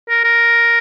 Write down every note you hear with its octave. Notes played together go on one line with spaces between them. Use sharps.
A#4
A#4